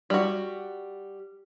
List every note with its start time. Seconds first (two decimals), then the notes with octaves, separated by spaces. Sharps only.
0.10 G3 F#4